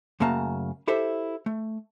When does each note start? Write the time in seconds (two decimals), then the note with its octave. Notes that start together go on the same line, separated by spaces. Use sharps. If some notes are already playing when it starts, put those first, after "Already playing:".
0.20 F#2 C#3 A3 A#3 A5 A#5
0.88 E4 G4 A4 C5 E5
1.46 A3